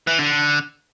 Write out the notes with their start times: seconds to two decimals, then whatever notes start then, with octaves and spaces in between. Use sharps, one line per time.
0.07 E3
0.19 D3